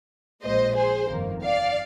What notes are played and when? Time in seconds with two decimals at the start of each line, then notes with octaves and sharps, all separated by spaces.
0.42 A#1 A#2 G#3 C5 D#5
0.76 G#4 C5
1.09 G1 F2 D#3 A#3
1.43 D5 F5